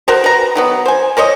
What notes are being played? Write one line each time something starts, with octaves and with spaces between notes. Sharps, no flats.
F#4 A#4 C5
B4 A#5
D#3 F#3 B3
C5 G#5
A#4 C5 C#5 D#5